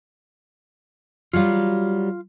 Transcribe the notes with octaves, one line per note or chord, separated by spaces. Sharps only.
F#3 G3 F4 F5